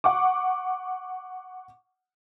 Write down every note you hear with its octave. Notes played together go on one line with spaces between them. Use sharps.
F#5 C#6 D6